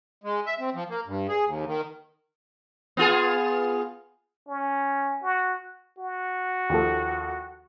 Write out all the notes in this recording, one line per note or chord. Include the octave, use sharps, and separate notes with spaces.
G#3
E5
C4
F3
A#3
G2
G#4
D#2
D#3
B3 F4 G#4
C#4
F#4
F#4
D#2 F3 A4